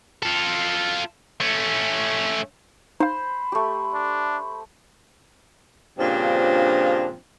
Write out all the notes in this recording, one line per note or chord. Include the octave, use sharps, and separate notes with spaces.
F4 A4
A3 C#4
D#4 C5 F5 B5
A3 G4
D4
G2 A#2 C#3 F3 C4 D4